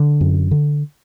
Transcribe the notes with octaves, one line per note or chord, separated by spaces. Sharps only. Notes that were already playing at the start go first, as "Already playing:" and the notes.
Already playing: D3
F#2
D3